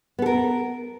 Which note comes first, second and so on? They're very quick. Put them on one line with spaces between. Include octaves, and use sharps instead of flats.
B3 A4 A#4